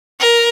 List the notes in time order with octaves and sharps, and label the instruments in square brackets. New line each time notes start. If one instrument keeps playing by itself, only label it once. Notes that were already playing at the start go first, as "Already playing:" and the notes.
[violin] A#4